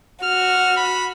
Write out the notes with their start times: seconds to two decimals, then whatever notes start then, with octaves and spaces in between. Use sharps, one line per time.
0.24 F#4 F6
0.77 B5